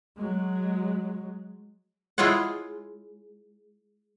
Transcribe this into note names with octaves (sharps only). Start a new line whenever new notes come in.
F#3 G#3
G#3 E4 F4 G#4 C#5 F#5